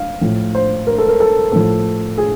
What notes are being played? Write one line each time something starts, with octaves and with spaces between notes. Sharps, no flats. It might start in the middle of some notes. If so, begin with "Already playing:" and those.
Already playing: F5
A2 F3
C5
A#4
A4
A#4
A4
A2 F3 A4
G#4